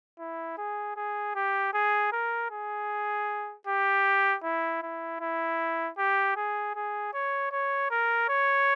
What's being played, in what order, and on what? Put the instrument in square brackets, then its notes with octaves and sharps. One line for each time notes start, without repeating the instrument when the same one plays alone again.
[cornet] E4
G#4
G#4
G4
G#4
A#4
G#4
G4
E4
E4
E4
G4
G#4
G#4
C#5
C#5
A#4
C#5